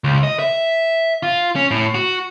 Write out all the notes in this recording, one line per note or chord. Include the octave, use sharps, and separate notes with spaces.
C#2
D#5
E5
F4
C#4
A2
F#4